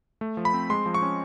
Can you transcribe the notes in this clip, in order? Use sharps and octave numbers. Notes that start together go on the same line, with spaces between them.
A3
F3
B5
C4
G#3 C6
F3
C#6
C#4